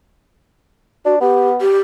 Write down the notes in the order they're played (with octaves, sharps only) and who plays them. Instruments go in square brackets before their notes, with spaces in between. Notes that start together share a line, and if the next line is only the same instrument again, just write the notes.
[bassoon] D4 [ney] F#4
[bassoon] B3 [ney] G4
[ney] G4